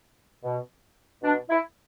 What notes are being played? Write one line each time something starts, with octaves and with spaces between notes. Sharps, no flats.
B2
B2 D4
E4